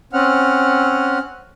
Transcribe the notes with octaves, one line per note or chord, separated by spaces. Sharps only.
C4 C#4 F#5 F6